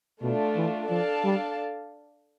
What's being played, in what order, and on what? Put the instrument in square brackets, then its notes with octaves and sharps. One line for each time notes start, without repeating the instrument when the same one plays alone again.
[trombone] B2 [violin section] A3 D4 F4
[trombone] E3
[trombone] F3 [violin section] D4 A4 D5 F5 A5
[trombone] G3